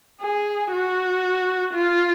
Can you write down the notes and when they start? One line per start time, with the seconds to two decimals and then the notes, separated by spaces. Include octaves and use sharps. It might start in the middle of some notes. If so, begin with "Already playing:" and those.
0.21 G#4
0.72 F#4
1.74 F4